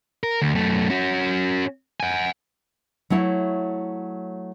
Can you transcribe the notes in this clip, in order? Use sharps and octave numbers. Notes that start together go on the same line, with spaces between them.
A#4
D2
F#2 A3
C#4 F#4
F#5 G#5
F#3 A3 E4 C#5